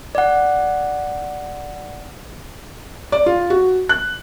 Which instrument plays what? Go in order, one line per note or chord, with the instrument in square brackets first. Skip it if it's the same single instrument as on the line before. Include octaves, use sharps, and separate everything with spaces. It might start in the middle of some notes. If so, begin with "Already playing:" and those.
[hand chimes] D5 F#5
[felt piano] D5
F4
F#4
F#6